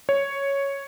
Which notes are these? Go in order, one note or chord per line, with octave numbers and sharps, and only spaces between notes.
C#5